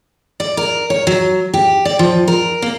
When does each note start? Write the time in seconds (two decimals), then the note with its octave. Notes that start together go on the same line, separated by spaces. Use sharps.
0.40 D5
0.57 A#4
0.90 C#5
1.07 F#3
1.54 G4
1.85 D5
1.99 F3
2.28 A#4
2.62 A#3